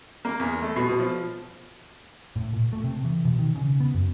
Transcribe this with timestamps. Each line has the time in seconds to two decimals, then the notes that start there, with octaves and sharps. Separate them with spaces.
0.25 A#3
0.40 E2
0.62 A3
0.76 B2
0.88 B2
1.00 F3
2.36 A2
2.53 A#2
2.73 A3
2.84 C3
3.05 E3
3.25 B2
3.39 D#3
3.55 C#3
3.80 B3
3.94 F#2